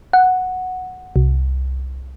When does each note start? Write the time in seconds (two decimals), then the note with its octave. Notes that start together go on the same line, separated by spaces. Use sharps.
0.13 F#5
1.16 C2